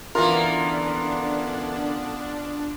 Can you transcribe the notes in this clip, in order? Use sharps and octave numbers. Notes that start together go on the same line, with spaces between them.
D3 E3 A#3 B3 C#4 D4 F4 A#4